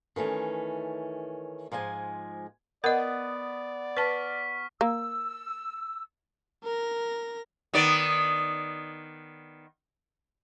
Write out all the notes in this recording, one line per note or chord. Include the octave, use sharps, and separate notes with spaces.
D#3 E3 A3 C#4
G#2 F3 G#3 G#5
B3 A#4 D5 D#5
B4 A5 C#6 F6 B6
A#3 E6
A#4 A#6
D#3 B3 D5